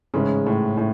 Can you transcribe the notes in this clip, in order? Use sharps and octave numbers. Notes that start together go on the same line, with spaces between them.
A1 G#2 C#3 G#3 C#4
A2
A2